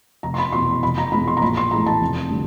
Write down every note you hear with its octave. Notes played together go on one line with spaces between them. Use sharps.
F1 A#5
C6
B5
E2 B2 C6
F1 B5
A#5
E2 B2 G#3 B5
C6
A#5
A#1 B5
C6
A2 E3 G#3 A#5
A5
F1
D3 G3